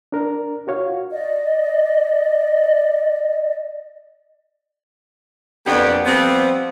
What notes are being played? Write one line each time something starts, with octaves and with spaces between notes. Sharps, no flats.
D4 A#4
F4 F#4 C#5 F5
D5 D#5
F2 B2 A#3 B3 D4 G4
F3 G3 B3 C4